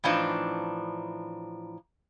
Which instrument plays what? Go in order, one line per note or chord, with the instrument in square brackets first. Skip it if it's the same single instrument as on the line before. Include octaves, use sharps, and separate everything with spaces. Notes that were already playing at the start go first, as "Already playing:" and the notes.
[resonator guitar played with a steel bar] A2 E3 F3 D4 D#4